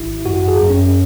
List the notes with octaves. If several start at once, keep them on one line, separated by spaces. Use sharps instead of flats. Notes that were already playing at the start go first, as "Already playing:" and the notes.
Already playing: G#1 E4
F#2 F#4
G#4
F#2
C#4